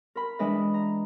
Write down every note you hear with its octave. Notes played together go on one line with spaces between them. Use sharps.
A#4 B5
E3 G#3 D4 B4 D#5 E5
A#5